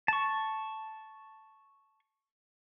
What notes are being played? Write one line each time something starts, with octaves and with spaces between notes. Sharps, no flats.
A5 C#6